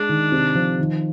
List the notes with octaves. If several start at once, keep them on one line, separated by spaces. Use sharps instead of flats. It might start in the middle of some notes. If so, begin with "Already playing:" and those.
Already playing: G#3 D4
D#3
C3
F3
D#3